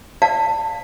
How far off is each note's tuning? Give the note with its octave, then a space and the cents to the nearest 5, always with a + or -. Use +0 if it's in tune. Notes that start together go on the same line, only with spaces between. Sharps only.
D5 +0 F5 +15 A5 +20